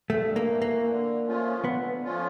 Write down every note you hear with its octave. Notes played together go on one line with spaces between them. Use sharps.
G2 A3
A#3
E3 A3
A#3
D3
F3 A3 C#4 F4
D3 B3
F3 A3 C#4 F4